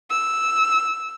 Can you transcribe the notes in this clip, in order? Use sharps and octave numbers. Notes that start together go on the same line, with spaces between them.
E6